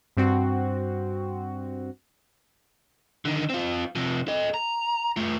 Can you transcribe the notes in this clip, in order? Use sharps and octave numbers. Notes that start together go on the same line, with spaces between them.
G2 C4 F#4
D3 D#3
C4 F4
C3 F3
A4 D#5
A#5
A3 F4